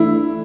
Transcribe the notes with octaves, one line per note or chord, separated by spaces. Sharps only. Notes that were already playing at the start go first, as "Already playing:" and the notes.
Already playing: E3 A3 D4 E4